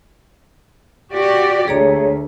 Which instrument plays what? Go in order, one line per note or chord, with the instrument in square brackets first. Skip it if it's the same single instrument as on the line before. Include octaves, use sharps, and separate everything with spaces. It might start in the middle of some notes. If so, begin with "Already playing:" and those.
[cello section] F#4 G4 D5
[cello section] D2 [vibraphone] G#4 C#5 A#5